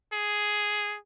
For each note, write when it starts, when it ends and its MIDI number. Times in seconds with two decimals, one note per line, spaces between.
0.13 0.97 68